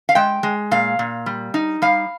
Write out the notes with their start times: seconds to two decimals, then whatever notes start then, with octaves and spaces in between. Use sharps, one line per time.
0.09 F5
0.15 G#3 G5
0.43 G#3
0.71 A#2 F5
0.99 A#2
1.26 G3
1.54 D#4
1.82 G3 F5